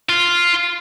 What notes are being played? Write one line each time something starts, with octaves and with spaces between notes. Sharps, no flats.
F4